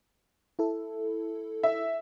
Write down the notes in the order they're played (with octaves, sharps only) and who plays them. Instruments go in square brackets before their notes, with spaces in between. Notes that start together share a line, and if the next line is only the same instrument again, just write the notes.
[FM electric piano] E4 A4
[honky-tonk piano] E5